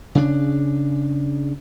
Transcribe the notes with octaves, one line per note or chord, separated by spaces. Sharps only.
C#3 D4